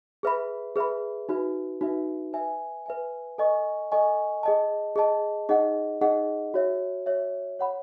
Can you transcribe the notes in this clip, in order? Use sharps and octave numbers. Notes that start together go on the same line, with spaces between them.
G#4 B4 E5 B5
G#4 B4 E5 B5
D#4 F#4 B4 E5
D#4 F#4 B4 E5
B4 E5 G#5
B4 E5 G#5
A4 D#5 G#5 C#6
A4 D#5 G#5 C#6
G#4 D#5 A5
G#4 D#5 A5
D#4 G#4 D#5 F#5
D#4 G#4 D#5 F#5
F#4 C#5 E5
F#4 C#5 E5
C#5 F#5 B5